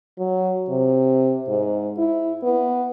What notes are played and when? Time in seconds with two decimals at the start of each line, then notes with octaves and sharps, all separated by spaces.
0.18 F#3
0.69 C3
1.48 G#2
1.98 E4
2.43 B3